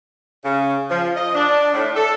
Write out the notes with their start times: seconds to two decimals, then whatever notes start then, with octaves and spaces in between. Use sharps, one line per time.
0.44 C#3
0.90 F3
1.16 D#5
1.35 D4
1.73 A2
1.96 A4